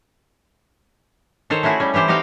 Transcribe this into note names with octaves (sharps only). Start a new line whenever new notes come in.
D#3 A4 C5 C#5
A3 C#4 E4 F#4 G#4
G3 C#4
E3 E4 G4 C5 D5
C4 D#4 F#4 G4 F5 G5